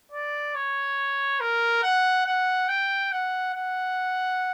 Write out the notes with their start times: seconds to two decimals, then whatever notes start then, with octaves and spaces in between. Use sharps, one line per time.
0.12 D5
0.55 C#5
1.40 A#4
1.83 F#5
2.26 F#5
2.68 G5
3.12 F#5
3.54 F#5